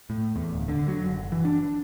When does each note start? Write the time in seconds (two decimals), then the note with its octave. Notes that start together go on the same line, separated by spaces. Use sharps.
0.10 A2
0.36 E2
0.53 D1
0.68 D3
0.88 F#3
1.04 F#1
1.32 E3
1.45 D4